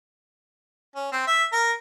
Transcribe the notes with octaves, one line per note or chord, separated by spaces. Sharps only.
C#4
C4
E5
A#4